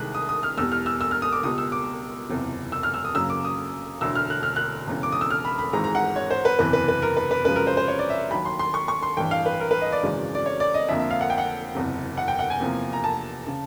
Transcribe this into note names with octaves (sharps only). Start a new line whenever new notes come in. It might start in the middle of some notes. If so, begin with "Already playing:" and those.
Already playing: C2 C3 D#3 G#3 F#6
D#6
D#6
F6
E2 B2 G3 E6
F6
E6
E6
F6
D#6
D6
C#2 B2 G3 D#6
E6
D6
F#1 E2 C3
E6
F6
E6
D#6
F#2 C#3 F#3 A#3 E6
D6
D#6
E1 D2 D3 E6
F6
F#6
F6
F#6
E1 E2 C#3
D6
D#6
E6
F6
B5
B5
G#1 G#2 E3 G#3 A#5
A#5
F#5
C#5
C5
B4
F#1 E2 C3 E3 B4
B4
B4
A#4
B4
B4
F#2 C#3 F3 G#3 B4
A#4
C5
C5
C#5
D5
E5
D#2 D#3 F#3 B5
C6
C6
C#6
C#6
C6
A1 G2 E3 G5
F5
B4
A#4
B4
D#5
D5
G#1 F#2 C#3 E3 G#3
D5
C#5
D5
D#5
F2 D3 F3 A#3 E5
E5
F5
F#5
G5
F#5
F#1 E2 C3
F#5
G5
F#5
G#5
E2 C3 F3 A#3
A#5
A5
C#3